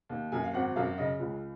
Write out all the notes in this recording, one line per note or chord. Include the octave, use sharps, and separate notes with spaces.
D#2
F#2 G#5
F5
G#1 F#5
F#2 F5
C#3 D#5
C#2